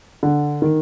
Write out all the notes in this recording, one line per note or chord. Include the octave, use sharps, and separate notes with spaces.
D3
D#3